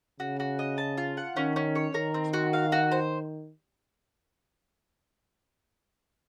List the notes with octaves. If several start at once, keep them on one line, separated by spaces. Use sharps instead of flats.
C#3 F#4
F#4
D#5
A5
F4
F#5
D#3 C#4
C#4
C#5
D#3 A#4
C4
F#4
F5
F#4
C5